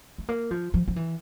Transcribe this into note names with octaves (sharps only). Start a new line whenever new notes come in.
A3
A#3
F3
F3
F3
E3